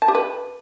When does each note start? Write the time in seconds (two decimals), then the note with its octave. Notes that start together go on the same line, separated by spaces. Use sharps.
0.02 A5
0.08 G4
0.15 B4